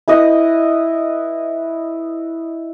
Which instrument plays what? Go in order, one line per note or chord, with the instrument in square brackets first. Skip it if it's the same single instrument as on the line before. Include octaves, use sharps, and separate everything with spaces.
[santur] E4 B4 D#5